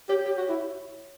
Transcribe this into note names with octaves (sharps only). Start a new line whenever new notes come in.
G4 C#5
G4 C#5
F#4
C#5
E4